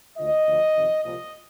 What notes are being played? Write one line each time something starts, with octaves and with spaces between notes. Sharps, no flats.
D2 D3 F3 D#5
D2 D3 F3
F2 C3 D#3
C2 A#2 F3 D#5